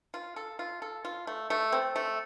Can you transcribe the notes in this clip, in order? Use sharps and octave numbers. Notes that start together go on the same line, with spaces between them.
F4
A4
F4
A4
F4
A3
A3
C4
A3